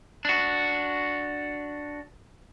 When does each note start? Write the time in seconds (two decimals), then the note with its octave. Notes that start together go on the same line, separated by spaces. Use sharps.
0.25 D4 F#4